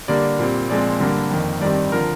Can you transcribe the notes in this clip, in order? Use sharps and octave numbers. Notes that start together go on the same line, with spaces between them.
D3 G3 A#3 D5
A#2 G3 C4
A#2 F3 G#3 C4 D5
G2 D3 G3 A#3
F2 D#3 A#3
G2 D#3 G3 C4 D5
D3 F3 A#4